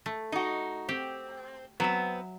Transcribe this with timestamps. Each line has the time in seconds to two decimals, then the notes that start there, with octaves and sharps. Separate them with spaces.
0.06 A3
0.32 D#4 F#4 D#5
0.89 C4 G4
1.80 F#3 B3 C4 E5